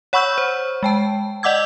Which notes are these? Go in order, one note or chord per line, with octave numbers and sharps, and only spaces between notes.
C#5 F#5 B5 C#6 E6 G6
C5
G#3 G5 A5
D5 D#5 F#5 D6 E6 G#6